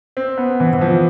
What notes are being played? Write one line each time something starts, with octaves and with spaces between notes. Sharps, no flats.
C4
B3
E3
E3
F3